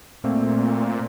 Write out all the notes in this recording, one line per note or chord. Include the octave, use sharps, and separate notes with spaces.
A#2 A3 A#3 C4